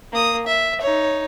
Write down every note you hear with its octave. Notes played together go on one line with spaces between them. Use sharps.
A#3 D#6
E5
D#4 C#5